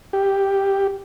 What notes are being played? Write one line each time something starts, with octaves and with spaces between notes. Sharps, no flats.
G4